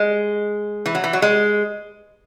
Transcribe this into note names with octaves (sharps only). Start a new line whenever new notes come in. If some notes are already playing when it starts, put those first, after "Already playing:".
Already playing: G#3
E3
F#3
E3
F#3
G#3